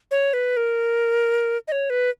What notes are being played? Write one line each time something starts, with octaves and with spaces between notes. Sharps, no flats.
C#5
B4
A#4
D#5
C#5
B4